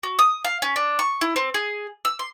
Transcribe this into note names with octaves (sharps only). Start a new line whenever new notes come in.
F#4
D#6
F5
C#4
D4
C#6
E4
C4
G#4
E6
C6